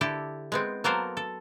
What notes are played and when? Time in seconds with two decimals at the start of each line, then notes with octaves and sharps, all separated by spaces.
0.01 D3 E4 G4 A4
0.52 G#3 B3 C4
0.84 F#3 A#3 B3 A4 A#4 C5
1.17 A4